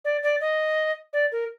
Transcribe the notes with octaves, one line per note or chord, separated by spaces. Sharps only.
D5
D5
D#5
D5
A#4